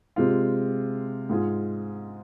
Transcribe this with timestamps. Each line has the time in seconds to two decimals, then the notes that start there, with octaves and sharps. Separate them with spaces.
0.16 C3 G#3 F4
1.30 G#2 G#3 F4 G#4